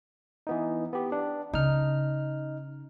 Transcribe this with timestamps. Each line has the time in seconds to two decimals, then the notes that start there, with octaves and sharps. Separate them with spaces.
0.47 E3 B3 D#4
0.93 B3 G4
1.12 D4
1.53 C#3 D#4 F6